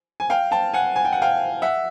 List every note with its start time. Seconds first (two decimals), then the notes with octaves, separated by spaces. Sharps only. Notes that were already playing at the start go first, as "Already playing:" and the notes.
0.20 G#5
0.30 F5 G5
0.51 G5 A5
0.74 F#5 G#5
0.96 G#5
1.05 G5
1.13 F#5
1.22 F5 G5
1.62 E5 F#5